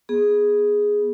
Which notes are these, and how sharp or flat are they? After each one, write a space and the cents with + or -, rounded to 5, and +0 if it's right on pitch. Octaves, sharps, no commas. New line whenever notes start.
B3 -20 G#4 +0